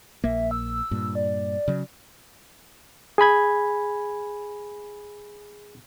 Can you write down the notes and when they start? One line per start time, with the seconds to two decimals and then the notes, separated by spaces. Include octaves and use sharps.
0.24 A#1 A#3 E5
0.51 E6
0.91 G2 A#2
1.15 D5
1.68 C#3 F#3
3.18 G#4 G#5 B5 G#6